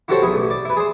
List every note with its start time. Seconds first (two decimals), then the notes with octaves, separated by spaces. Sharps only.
0.08 E4 F#4 G4 A4 C5 C#5
0.23 B1 E4 G#4
0.36 A1
0.50 D5
0.65 E4 B4
0.77 G#4 C5